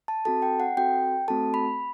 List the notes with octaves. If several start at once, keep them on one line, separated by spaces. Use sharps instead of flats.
A5
C4 F#4 A4 A5
G5
F#5
C4 F#4 A4 G5
A3 C4 F#4 A4 A5
B5